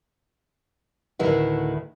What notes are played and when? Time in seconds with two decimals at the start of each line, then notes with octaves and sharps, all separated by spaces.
1.19 D2 A2 D#3 E4 B4 F#5